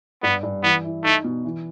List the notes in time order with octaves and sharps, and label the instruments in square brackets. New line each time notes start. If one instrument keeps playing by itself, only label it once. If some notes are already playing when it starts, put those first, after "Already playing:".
[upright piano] G2 [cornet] B3
[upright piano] G2
[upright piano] E3 [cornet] B3
[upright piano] E4
[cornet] A3 [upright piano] D#4
[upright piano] B2
E3